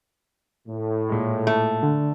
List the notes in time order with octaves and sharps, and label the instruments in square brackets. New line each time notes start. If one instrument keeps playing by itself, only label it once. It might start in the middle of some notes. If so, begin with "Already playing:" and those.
[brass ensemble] A2
[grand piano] A#2 G#3
[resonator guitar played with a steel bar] A3
[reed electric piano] D3